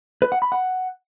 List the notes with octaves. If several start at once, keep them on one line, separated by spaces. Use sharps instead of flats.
B4
F#5
B5
F#5